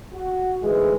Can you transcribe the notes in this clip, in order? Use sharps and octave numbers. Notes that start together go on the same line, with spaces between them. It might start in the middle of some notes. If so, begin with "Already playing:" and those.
F#4
D2 G#2 E3 G#3